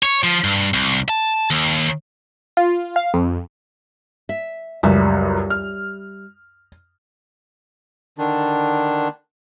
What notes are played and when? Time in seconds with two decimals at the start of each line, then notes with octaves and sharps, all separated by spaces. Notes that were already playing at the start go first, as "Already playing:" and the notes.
0.03 C#5
0.24 F3
0.44 G2
0.73 C2
1.09 A5
1.51 D#2
2.57 F4
2.96 F5
3.14 F2
4.29 E5
4.83 C#2 F#2 G3 E5
5.50 F6
8.18 D3 D#3 D4